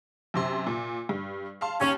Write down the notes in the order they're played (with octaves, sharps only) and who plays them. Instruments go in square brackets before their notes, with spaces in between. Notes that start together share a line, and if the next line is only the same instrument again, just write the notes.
[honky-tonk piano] F#2 C3 C6
A#2
G2
F5 A5 C6
[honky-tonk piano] D#2 [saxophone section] C#4